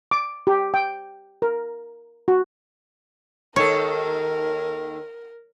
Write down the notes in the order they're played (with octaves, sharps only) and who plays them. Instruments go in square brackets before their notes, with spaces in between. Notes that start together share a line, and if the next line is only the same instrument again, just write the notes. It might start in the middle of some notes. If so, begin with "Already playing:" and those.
[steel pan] D6
G4
G5
A#4
F#4
[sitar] D#2 D#3 A4 [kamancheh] A#4 [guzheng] C#5